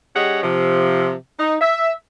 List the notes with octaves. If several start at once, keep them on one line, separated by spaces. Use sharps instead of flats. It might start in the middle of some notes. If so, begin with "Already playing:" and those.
G3 C#4 G4 G#4 D#5 F#5
C3 F3
D#4
E5